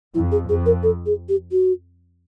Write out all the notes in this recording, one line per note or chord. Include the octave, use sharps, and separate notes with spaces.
F2 E4
G#4
F2 G#4
A#4
A4
G#4
G4
F#4